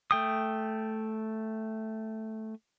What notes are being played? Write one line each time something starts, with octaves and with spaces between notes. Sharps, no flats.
A3 G5 D#6